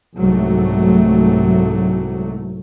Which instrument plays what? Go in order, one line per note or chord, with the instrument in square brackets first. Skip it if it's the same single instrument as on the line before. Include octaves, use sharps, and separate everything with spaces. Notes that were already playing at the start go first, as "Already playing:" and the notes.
[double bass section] C2 G#2 F#3 A3